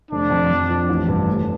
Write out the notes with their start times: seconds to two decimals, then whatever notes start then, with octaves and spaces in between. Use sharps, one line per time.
0.12 F1 D4
0.31 F2
0.51 F2
0.69 F3
0.89 A1
1.09 G2
1.27 F1